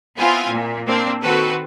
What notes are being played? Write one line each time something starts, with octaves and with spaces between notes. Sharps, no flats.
B3 C4 E4 F4 G#5
A#2
A#3 C4 D4
D#3 C4 F#4 A4 B4